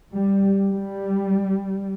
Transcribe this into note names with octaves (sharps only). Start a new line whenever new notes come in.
G3
G3